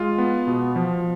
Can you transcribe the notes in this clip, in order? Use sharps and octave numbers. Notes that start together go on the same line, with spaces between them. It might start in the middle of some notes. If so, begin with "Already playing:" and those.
Already playing: G#3 F4
B3
B2
F3